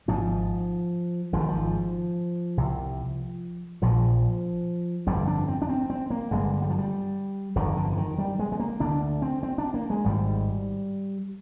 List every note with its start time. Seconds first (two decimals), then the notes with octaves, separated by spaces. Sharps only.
0.08 G#1 G#2 F3
1.33 G#1 G#2 F3
1.40 D#3
1.49 F3
2.57 C2 C3
3.82 A#1 A#2 F3
5.07 G1 F2 D3 G3
5.27 D4
5.48 C4
5.62 D4
5.69 C4
5.90 C4
6.10 A#3
6.31 G1 G2 D3 G#3
6.62 G3
6.70 F3
6.78 G3
7.56 G1 F2 D3 D#3
7.77 D3
7.92 D3
7.97 D#3
8.18 G3
8.39 G#3
8.52 G#3
8.60 A#3
8.80 D2 D3 D4
9.22 C4
9.43 C4
9.58 D4
9.74 A#3
9.90 G#3
10.05 G#1 G#2 G3